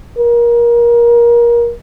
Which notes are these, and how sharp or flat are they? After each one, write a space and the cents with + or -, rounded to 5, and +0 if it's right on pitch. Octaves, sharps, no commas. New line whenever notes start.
A#4 +25